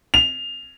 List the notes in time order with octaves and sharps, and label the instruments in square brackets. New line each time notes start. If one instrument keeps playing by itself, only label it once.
[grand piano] F7